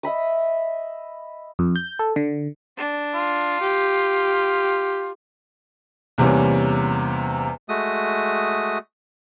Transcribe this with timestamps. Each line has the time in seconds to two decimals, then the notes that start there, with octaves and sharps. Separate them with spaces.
0.03 D#5 E5 B5 D#6
1.59 F2
1.76 G6
1.99 A4
2.16 D3
2.78 D4
3.15 F4
3.61 G4
6.18 E2 C3 G3 A#3 C#4
7.69 G#3 A3 F#4 D#6